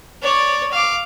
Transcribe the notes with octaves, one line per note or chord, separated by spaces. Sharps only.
C#5 D5
F5 D6